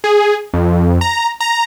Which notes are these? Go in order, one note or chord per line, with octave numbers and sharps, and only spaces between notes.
G#4
F2
A#5
A#5